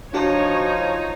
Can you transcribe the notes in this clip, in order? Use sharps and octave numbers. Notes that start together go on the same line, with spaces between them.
F3 D4 D#4 F#4 C5 C#5